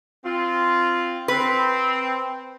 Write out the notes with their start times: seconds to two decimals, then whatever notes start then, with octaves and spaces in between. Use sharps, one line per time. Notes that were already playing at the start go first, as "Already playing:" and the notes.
0.24 C4 F4
1.28 C4 B4